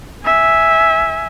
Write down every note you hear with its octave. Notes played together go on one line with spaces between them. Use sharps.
E5 G#5